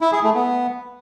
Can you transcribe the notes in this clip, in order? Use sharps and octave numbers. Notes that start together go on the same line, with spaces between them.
E4
G#4
A3
B3